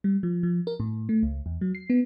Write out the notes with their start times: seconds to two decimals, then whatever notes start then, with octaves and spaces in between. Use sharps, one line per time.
0.04 G3
0.23 F3
0.43 F3
0.67 A#4
0.80 A2
1.09 A3
1.23 C#2
1.46 E2
1.61 F#3
1.75 C7
1.90 B3